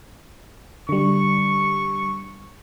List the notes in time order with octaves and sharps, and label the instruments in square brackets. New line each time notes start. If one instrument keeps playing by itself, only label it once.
[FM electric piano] D3 G3 [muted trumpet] C#6